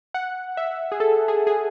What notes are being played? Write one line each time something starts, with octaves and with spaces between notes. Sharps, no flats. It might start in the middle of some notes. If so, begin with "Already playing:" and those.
F#5
E5
G#4
A4
G#4
G#4